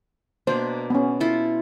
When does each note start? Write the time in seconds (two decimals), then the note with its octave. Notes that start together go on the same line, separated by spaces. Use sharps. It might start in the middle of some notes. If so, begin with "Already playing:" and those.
0.47 B2 A#3 D4 C5
0.90 B3 C#4
1.20 E4 F4 A4